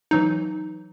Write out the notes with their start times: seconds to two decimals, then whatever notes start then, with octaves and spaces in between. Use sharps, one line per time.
0.11 E3 F#3 D#4